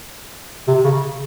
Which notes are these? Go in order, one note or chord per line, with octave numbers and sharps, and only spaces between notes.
C3
C#3